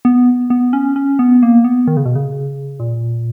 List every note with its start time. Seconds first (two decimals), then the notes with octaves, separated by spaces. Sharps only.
0.05 B3
0.50 B3
0.73 C#4
0.96 C#4
1.19 B3
1.43 A#3
1.64 B3
1.88 D#3
1.97 C#3
2.06 B2
2.15 C#3
2.80 A#2